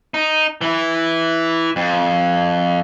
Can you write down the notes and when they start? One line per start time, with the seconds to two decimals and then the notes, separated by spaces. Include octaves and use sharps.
0.14 D#4
0.61 E3 E4
1.76 F2